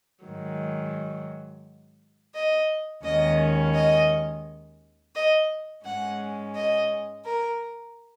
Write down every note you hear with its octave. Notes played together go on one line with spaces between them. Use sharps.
G#2 D#3 F#3
D#5
D#2 D#3 G#3 C#4 D#5
D#5
D#5
G#2 G#3 C#4 F#5
D#5
A#4